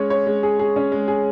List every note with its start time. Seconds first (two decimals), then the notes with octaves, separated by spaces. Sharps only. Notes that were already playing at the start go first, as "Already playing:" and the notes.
Already playing: G#3 C#4 C#5
0.10 C#5
0.27 G#3
0.43 G#4
0.59 G#4
0.76 C#4
0.92 G#3
1.08 G#4